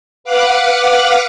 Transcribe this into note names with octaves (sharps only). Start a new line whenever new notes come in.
B4 F5 F#5 D6 F6 F#6